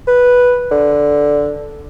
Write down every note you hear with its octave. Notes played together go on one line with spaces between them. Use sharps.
B4
D3